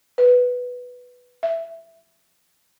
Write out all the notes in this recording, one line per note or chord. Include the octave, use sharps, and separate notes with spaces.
B4
E5